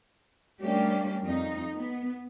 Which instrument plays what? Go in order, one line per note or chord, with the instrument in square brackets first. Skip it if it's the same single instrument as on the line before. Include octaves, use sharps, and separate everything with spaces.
[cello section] G3 A3 A#3 C#4 D4 G4
F2 D#4
B3